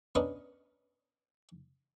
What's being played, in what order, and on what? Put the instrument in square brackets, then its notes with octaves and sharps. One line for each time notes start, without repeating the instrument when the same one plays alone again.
[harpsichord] B3 C#4 D4 A#4 B4 D#5